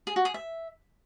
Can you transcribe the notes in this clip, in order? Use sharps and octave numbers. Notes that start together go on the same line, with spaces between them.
G#4
F#4
G#4
E5